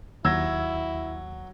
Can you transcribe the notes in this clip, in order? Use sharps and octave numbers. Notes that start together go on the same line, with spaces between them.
D#2 F#3 E4 E6 G#6 A#6